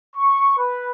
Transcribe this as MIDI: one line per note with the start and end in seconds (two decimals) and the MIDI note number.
0.15 0.53 85
0.58 0.91 71